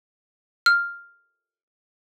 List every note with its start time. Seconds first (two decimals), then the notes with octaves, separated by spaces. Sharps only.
0.66 F6